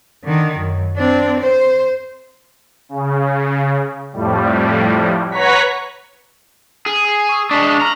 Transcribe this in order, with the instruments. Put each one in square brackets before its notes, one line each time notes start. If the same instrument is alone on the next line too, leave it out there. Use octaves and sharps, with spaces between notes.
[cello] D3 D#3
F#2
C4 D4
C5
[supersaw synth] C#3
F2 A2 G3
B4 C#5 F#5 A#5 C#6 B6
[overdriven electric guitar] G#4
[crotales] D#6 C7
C#6 E6
[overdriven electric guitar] G#3 D4 [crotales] C#6 B6 C7
[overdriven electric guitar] A#5 [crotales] F6 F#7